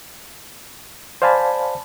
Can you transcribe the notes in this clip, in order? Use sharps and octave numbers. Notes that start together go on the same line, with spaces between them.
C5 D5 F5 G#5 A5 B5